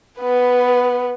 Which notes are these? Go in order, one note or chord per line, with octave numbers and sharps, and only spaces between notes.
B3 B4